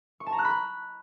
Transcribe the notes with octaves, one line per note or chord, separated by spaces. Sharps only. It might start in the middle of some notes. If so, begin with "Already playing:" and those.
C#6
A5
A#5
F#6
B5